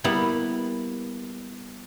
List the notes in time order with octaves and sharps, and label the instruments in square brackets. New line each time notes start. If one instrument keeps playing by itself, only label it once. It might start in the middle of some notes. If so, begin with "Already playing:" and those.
[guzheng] G3 A#3 B3 E4